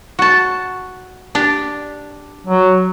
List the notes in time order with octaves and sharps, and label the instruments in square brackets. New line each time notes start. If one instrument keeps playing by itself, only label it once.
[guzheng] F#4 A5
D4 G4
[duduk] F#3